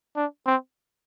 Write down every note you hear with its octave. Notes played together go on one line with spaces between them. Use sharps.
D4
C4